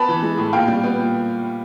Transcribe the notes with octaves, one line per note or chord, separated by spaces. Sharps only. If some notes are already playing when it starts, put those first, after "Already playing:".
Already playing: B3 A5 B5
E3
G#3
A2
A#2 F5 G5
G3
B3
A#2